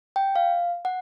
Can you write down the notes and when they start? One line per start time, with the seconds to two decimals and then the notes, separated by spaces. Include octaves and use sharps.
0.16 G5
0.36 F5
0.85 F#5